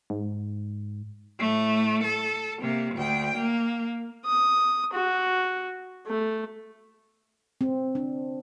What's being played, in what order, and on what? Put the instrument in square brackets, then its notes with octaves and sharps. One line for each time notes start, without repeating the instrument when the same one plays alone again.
[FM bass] G#2
[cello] A2 A3
A4
C3 A#3
D2 G5
A#3
[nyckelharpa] D#6
F#4
A3
[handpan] C4
D4